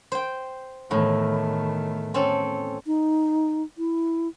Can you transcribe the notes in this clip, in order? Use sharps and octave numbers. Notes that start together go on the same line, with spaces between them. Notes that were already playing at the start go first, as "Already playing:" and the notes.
C5 G5
E2 A2 D#3 A3
C4 C#4 A4
D#4
E4